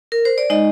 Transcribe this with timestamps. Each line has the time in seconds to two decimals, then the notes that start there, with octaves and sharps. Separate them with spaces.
0.12 A#4
0.25 C5
0.38 D5
0.50 G#3 D#4 D#5